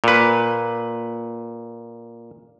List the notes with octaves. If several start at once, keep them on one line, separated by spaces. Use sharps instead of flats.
A#2 B4